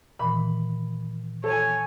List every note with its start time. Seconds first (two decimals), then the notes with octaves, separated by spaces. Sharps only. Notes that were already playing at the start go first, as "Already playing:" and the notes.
0.19 A#2 D#3 E3 B5
1.44 A4 C#5 G#5